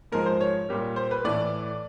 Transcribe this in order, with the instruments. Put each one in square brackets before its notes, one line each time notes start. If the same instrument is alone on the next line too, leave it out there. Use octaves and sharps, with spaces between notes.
[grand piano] G#2 F3 G#3 A#4
C5
C#5
A#2 G3 A#3
C5
B4
A2 E3 A3 D5